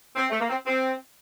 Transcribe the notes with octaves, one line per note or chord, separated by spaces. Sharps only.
C4
A3
A#3
C4
C4